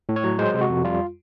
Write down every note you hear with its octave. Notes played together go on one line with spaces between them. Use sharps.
A2
C#5
F#3
G#3 C5
C3
F#4
F2
G3 F4